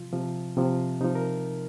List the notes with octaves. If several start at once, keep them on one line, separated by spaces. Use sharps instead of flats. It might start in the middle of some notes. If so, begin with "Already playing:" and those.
Already playing: C3 F3 F4
C3 F3
C3 F3
C3 F3 D#4
A#4